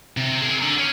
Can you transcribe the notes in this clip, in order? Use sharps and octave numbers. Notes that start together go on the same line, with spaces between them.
C3
G#4 A#4
D3
C#4